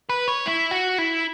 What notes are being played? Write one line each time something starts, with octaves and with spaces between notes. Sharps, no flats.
B4
C#5
E4
F#4
E4